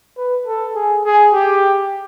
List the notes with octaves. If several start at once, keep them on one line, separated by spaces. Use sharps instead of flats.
B4
A4
G#4
G#4
G4